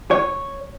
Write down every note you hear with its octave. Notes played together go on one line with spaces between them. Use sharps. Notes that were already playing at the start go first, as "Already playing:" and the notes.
C#5